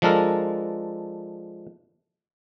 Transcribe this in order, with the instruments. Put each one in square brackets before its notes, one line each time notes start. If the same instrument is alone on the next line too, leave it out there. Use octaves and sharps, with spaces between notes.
[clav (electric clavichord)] F3 G#3 D4 A4 A#4